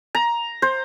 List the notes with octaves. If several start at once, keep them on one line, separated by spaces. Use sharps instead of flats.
A#5
C5